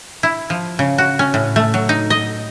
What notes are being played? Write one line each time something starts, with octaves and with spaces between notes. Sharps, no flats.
E4
F3
C#3
F#4
C#4
A2
A3
F#3
D#4
D#5